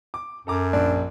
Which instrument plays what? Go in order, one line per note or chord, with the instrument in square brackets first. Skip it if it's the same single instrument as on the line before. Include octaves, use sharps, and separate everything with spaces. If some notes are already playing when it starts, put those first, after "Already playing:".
[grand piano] D6
[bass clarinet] F#2 [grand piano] A4 A#5 D6
[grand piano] A#1 [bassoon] D4